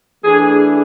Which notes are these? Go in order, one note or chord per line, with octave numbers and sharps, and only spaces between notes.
E3 A3 D4 G#4